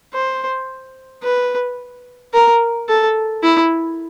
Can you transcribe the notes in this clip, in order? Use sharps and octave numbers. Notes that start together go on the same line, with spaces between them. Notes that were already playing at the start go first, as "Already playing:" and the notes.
C5
B4
A#4
A4
E4